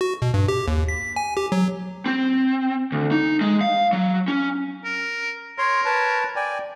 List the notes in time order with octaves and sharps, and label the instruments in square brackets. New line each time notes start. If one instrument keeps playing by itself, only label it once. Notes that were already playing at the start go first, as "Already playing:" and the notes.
[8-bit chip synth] F#4
B2
G2
G4
D#2
B6
G#5
G4
F#3
[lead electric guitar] C4
D2
D#4
G#3
F5
F#3
C#4
[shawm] A#4
[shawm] A#4 [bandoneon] C#5 C6
[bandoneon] B4 C#5 A5
D5 G5 G#5